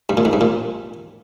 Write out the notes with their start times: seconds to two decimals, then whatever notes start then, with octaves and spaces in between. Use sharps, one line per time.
0.10 G2
0.17 A#2
0.25 G#2
0.33 G2
0.41 A#2